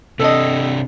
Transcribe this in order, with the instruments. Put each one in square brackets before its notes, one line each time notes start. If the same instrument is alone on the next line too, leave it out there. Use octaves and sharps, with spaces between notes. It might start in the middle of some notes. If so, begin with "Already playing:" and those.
[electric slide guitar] C3 D4 [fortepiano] A4 D#5